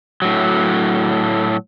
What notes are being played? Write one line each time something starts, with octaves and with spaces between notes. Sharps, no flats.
A2 F#3